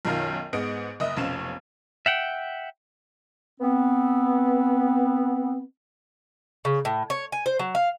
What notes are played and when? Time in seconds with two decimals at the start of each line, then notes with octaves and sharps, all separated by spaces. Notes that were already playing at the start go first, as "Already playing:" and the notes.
0.05 B1 F#2 D#3 F4 A#4 F6
0.53 G#2 G#3 B3 D#5 D7
1.00 F#1 D#5 E5
1.17 F1 B1 C4 C#4 F5 E7
2.06 E5 F#5 G5
3.61 B3 C4
6.65 C#3
6.85 A2
7.10 C#5
7.32 G#5
7.46 C5
7.59 F#3
7.75 F5